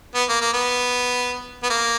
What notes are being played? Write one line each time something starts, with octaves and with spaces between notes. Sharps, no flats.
B3
A#3
A#3
B3
B3
A#3